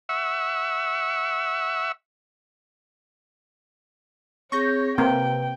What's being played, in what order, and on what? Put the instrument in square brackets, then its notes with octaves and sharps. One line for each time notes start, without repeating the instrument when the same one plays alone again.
[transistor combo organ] E5 F#5 C#6 E6
[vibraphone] C4 G#4 [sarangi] C#5 [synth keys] C#6 G6 A#6
[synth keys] C3 [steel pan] A#3 C4 [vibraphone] B4 [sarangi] G5